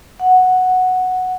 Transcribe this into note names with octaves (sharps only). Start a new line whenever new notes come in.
F#5